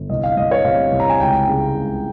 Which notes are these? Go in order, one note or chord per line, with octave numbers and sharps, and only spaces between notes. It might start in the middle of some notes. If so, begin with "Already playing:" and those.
Already playing: G1
C2 D#5
F5
C2 D#5
C#5
C3 F5
C2
A#5
G#5
C#2 G5
C#3
C#2